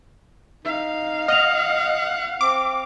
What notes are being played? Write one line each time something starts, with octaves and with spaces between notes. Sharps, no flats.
D#4 F5
D#5 F#5 F6 F7
C4 D6